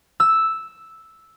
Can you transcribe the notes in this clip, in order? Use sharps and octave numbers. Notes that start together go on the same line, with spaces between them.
E6